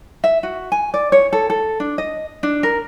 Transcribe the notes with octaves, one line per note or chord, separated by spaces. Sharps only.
E5
F#4
G#5
D5
C#5
A4
A4
D4
D#5
D4
A#4